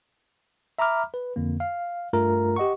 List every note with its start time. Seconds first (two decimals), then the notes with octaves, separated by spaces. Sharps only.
0.79 E5 A#5 B5 D6 F6
1.14 B4
1.36 F2 D3 A#3
1.60 F5
2.13 G2 A3 F4 A#4 A#5
2.56 G4 D#5 F#5 C#6